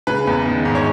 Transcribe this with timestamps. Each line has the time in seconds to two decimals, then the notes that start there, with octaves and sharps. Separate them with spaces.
0.07 C#3 B4
0.27 E2
0.46 D#3
0.65 G#2
0.75 C#5